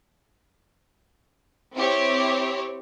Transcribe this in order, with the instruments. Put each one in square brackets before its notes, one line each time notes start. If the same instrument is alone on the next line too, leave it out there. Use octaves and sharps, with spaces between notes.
[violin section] C4 E4 G4 C#5